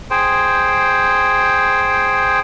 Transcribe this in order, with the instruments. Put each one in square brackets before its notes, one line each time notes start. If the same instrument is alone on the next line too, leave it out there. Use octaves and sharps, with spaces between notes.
[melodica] G#4 C5 G5